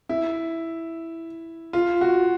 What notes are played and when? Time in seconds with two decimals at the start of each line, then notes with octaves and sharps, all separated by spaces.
0.09 E4
1.73 F4
2.01 F#4